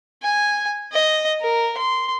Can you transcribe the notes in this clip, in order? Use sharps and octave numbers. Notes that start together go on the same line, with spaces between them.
G#5
D#5
A#4
C6